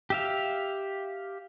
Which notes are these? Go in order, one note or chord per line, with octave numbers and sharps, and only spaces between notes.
G4 E5 F5